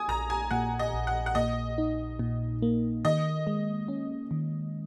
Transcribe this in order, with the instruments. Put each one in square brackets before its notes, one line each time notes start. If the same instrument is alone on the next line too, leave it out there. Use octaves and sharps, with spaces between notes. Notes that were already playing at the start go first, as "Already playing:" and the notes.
Already playing: [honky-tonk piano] G#5 D#6
[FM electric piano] A#1 [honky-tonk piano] A#5
[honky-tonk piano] G#5
[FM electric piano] A#2 [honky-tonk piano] F#5
[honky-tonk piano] D#5
[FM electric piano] A#1
[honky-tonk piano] F#5
F#5
[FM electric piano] A#2 [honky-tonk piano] D#5
[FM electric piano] D#4
A#2
A#3
[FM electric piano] D#3 [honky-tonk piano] D#5
[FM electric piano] G#3
C#4
D#3